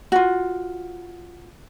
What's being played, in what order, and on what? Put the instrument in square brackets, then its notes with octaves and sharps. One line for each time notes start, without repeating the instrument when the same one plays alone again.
[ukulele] F4 F#4